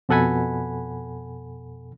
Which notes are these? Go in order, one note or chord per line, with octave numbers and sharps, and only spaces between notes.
F2 B2 A4 F#5 G#5 B5